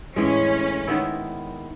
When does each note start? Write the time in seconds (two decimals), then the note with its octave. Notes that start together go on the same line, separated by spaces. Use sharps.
0.16 A2 E3 G#3 C#4
0.87 D#3 G#3 B3 E4